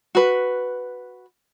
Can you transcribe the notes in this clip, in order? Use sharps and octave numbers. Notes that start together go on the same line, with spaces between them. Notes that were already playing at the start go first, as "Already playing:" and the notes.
F#4 B4